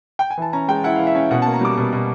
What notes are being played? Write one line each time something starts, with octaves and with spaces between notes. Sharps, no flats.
G5
G#5
E3 A5
C#4 A#5
G#3 G5
E4 F#5
E3 F5
E5
C#4
B2 F#5
A#3 A5
A#5
G3 D6
B2
B2